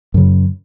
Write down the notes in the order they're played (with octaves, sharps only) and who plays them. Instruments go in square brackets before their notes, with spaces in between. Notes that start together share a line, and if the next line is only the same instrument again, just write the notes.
[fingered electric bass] F#2 C#3